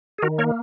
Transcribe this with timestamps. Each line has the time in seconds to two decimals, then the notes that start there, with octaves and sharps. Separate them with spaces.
0.18 G#4
0.22 D#3 F#4 A#4
0.38 A#3 A#4 C#5